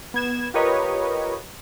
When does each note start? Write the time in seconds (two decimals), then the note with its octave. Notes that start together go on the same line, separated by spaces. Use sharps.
0.14 B3 G#6 E7
0.54 F4 G4 A#4 B4 C#5 D#5